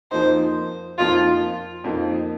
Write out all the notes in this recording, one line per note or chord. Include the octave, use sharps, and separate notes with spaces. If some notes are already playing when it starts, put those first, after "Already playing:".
F2 F3 A#3 D#4 C5
F2 F3 A#3 D#4 F4
F2 F3 A#3 D#4